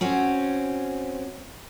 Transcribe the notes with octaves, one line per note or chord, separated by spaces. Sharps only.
C4 C#4 F#4